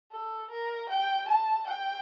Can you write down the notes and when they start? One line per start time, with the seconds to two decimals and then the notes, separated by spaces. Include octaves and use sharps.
0.12 A4
0.51 A#4
0.90 G5
1.28 A5
1.67 G5